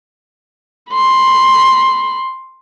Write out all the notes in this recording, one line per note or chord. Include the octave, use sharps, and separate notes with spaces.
B5 C6